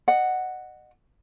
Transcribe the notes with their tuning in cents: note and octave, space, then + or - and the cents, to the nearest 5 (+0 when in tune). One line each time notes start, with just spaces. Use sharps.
D#5 -30 F#5 +0